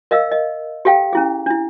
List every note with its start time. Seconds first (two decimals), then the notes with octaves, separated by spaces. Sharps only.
0.11 A#4 D#5 F5 E6
0.31 D#5
0.85 G4 A4 F5 G5
1.13 C#4 E4 G#4
1.46 D4 E4